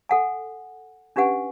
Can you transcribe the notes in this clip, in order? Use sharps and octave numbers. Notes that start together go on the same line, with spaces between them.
A4 F#5 G#5
C#4 D4 G4 B4 F#5 G#5